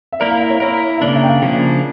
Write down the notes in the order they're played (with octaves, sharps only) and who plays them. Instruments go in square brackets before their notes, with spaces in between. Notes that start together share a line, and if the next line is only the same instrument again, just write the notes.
[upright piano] E5
[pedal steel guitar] A#3 E4 A#4 [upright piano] D5
[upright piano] F5
E5
C#5
[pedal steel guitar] A#3 E4 A#4 [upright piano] C#5
[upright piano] E5
[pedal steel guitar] C#3 F3 A#3 D4 [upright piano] D5
[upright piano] E5
G5
F5
[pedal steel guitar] C#3 F3 A#3 D4